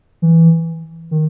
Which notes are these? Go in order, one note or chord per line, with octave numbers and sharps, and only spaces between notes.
E3
D#3